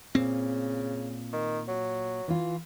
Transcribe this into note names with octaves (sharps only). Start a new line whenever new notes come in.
A#2 C#3 C4
D#3
F#3
E3 F4